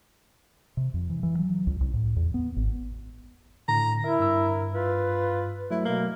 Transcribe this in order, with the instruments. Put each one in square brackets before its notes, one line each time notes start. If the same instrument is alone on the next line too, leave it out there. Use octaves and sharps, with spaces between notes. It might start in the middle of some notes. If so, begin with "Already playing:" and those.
[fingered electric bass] C3
F2
E3
E3
F#3
C#2
C2
A2
E2
B3
G#1
[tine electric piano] A2 D3 [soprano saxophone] A#5
[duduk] E4 [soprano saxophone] A#4 [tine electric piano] E5
[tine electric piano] G2 E6
[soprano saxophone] F4 [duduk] B4
[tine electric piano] F#3 A3 [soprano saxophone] E4
[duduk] B2 [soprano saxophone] A#3